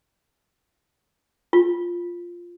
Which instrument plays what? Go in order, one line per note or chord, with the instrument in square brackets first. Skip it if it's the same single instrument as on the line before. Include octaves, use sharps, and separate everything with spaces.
[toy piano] F4